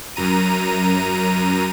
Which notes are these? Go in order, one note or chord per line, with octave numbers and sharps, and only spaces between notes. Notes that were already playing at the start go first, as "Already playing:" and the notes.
F#2 A#5 D#7